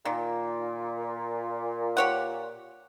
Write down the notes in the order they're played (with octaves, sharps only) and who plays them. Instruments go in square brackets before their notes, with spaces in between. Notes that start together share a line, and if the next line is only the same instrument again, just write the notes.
[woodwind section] A#2 [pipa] D#3
[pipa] G4 C#5 F#5